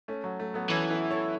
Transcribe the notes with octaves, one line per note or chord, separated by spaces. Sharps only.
A3 C#4
F#3
A3
F#3 B3
E3 A3 C#4
B3 E4
A4 C#5